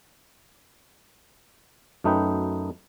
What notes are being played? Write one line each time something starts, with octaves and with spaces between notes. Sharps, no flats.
F#2 A3 D#4 B4 G5